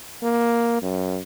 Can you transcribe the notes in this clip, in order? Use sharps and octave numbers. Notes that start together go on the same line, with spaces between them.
A#3
F#2